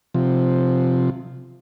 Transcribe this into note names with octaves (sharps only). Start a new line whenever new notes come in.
C3 F3